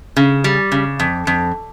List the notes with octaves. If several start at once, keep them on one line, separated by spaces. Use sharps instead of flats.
C#3
G3
C#3
F2
F2